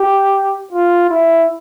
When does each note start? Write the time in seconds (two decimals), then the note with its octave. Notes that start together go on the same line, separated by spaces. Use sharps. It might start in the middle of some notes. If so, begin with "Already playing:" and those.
Already playing: G4
0.73 F4
1.10 E4